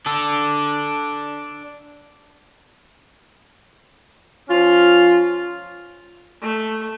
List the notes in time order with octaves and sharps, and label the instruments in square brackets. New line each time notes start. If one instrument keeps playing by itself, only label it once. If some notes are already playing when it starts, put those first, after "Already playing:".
[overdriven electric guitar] D4 A4
[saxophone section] F3 C#4 F4
[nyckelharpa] A3